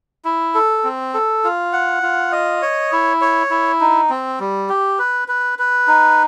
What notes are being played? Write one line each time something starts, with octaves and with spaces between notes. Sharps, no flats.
E4
A4
C4
A4
F4
F#5
F4
D#5
C#5
E4
C#5
E4
D#4
C4
G3
G4
B4
B4
B4
D#4